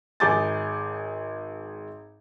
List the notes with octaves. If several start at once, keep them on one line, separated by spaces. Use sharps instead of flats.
G#1 G#4 D6 G6 A6